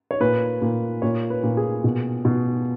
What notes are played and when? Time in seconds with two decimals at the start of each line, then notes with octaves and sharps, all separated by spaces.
0.11 C#5
0.21 A#2 B4
0.62 A#2
1.02 A#2 C#5
1.30 B4
1.43 A#2
1.57 G#4
1.84 B2
2.25 B2